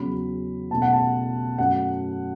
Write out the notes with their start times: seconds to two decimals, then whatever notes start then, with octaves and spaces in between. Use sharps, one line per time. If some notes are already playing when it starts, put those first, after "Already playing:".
Already playing: E2 C#3 F#3 C#4 B5
0.70 B2 A3 C#4 A5
0.82 F#5
0.93 A5
1.58 F#2 F#3 A3 C#4 F#5